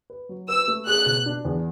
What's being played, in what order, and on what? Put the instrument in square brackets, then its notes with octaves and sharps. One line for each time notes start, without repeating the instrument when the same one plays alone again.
[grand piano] B4
F#3
[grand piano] B4 [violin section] E6
[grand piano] A3
[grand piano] G#4 [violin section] F#6
[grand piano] B2
D4
E2